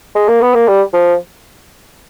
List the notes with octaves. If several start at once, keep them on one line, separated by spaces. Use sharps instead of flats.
G#3
A#3
B3
A#3
G3
F3